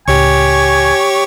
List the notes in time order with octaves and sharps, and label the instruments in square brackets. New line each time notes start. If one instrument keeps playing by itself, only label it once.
[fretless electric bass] C#2 A2 [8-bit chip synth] G4 C#5 C#6 [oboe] G#5